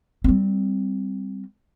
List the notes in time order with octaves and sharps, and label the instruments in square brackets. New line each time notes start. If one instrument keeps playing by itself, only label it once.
[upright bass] G3 C4